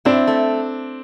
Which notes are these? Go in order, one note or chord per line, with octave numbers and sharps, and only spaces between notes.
C4 D4 E4
A3